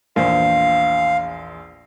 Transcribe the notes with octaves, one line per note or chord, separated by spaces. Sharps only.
A#1 E2 C5 F5